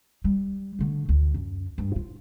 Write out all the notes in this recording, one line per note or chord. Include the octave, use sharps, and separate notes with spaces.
G3
D3 A3
D2
F#2
G2
F4